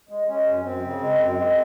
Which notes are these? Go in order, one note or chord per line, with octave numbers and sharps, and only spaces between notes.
G#3
G#3 C#4
F#2
F#2 C4
C#3
G#3
F#2
G#3